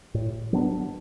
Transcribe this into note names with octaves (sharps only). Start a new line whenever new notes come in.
A2
F#3 B3 D4